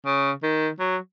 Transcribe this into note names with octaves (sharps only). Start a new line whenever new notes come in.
C#3
D#3
F#3